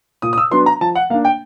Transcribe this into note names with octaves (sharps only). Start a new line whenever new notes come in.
A#2 D#6
D#6
E6
F#3 B3 D4 C6
A#5
F3 A5
F#5
A#3 D4 F5
G5